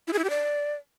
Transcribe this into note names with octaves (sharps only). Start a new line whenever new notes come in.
E4
G#4
E4
G4
D5